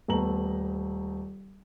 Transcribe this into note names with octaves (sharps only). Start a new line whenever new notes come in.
D#1 A3 B3 A#5 F#7